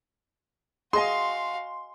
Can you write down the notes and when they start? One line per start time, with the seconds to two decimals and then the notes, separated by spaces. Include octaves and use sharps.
0.93 F#4 G#4 D#5 F5 G#5 C6